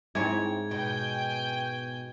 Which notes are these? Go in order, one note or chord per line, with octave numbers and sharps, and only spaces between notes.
G#2 C4 E4 C#5 G#6
B2 G5 G#5 G6